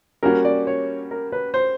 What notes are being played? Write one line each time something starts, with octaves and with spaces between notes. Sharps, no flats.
G3 A#3 C#4 F#4 A#4
D5
C#5
A#4
B4
C5